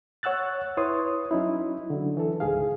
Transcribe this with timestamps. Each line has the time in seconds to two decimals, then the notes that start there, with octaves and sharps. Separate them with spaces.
0.23 C#5 F#5 E6 F#6 A6
0.77 E4 B4 C#5 C6 D#6
1.31 F#3 C#4 D#4 E4
1.90 D3 F#3
2.17 E3 A4
2.40 C#2 G#2 G#4 F5